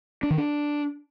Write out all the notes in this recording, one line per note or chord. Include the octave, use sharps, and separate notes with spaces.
D4
D#3
D4